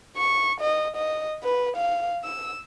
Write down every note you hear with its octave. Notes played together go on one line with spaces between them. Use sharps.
C#6
D#5
D#5
B4
F5
E6